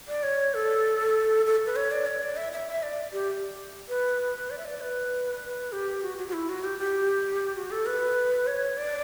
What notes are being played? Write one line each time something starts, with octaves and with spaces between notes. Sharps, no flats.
D5
C#5
A4
A4
B4
C#5
D5
C#5
D5
E5
E5
E5
D5
G4
B4
D5
E5
D5
B4
G4
F#4
F#4
F#4
E4
F#4
G4
G4
F#4
A4
B4
C#5
D5